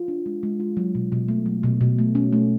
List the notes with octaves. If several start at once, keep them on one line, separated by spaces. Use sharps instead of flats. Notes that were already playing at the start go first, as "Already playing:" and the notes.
Already playing: F4
D4
G#3
G#3
F4
F#3
B2
B2
A3
F#3
B2
B2
A3
C#4
A3